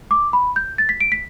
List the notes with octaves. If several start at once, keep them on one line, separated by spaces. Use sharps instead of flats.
D6
B5
G6
A6
B6
D7
B6